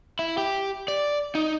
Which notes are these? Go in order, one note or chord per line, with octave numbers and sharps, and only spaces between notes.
E4
G4
D5
D#4